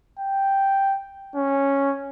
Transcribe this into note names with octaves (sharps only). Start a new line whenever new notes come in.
G5
C#4